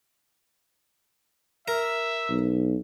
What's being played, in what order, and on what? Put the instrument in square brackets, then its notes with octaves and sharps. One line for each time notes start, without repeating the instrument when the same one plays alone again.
[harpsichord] A#4 [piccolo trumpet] E5
[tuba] B1